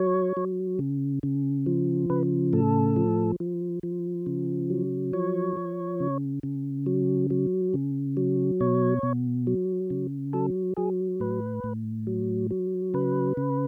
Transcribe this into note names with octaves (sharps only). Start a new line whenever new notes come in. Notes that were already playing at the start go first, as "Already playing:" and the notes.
Already playing: F#3 C#5
F#3
C#3
C#3
F3
C#3 B4
A2 A4
F3
F3
F3
C#3
F#3
F3 C#5
F3
C#3
C#3
F#3
F#3
C#3
F#3
B2 C#5
B2
F#3
C#3
F#3 A4
F#3 G#4
A2 B4
A2
F#3
F#3
C#3 B4
C#3